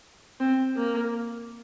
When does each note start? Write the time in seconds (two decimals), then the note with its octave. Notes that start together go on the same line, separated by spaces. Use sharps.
0.40 C4
0.76 A#3